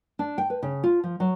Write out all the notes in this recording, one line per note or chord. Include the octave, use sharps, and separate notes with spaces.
D4
G5
B4
C#3
F4
F3
F#3